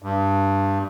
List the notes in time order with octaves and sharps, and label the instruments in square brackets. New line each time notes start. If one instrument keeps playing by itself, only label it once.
[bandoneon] G2